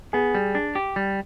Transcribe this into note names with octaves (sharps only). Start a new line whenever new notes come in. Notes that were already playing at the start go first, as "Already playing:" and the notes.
B3 G#4
G3
D4
G4
G3